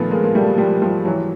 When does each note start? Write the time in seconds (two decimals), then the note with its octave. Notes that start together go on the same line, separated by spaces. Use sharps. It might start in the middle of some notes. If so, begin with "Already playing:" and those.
Already playing: A#2 D#3 F3 A3 B3
0.11 G#3 A#3
0.24 A#3
0.35 G3 A3
0.58 F3 G3
0.82 F3 G3
1.05 E3 F#3